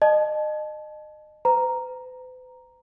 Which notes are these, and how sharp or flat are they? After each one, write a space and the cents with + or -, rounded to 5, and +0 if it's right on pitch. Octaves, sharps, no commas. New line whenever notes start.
D#5 -30 A5 -25
B4 +45 A#5 +0